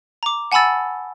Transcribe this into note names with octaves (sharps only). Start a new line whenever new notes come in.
A#5 D6
F#5 G#5 A5 B5 E6 A6